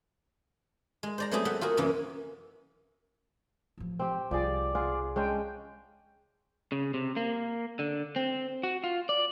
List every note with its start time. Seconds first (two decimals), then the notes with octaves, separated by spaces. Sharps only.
1.03 G#3
1.18 C5 D5 A#5
1.31 F#3 A3 B3 C4 G4 G#4
1.45 A3 E5 F#5 G5
1.61 F4 F#4 G#4 A#4
1.77 F#2 C3 E3 A#3 C#4
3.78 A1 F3
3.99 C4 G4
4.31 C2 F3 G3 G#4 D5
4.75 F4 G#4 F#5
5.16 G#3 C#4 D4 G5
6.72 C#3
6.94 C3
7.17 A#3
7.79 D3
8.16 C4
8.63 F#4
8.84 F4
9.09 D5